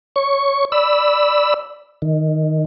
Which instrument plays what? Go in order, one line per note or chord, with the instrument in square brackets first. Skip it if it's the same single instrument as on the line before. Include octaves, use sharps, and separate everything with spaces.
[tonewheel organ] C#5 C#6
D5 B5 E6
D#3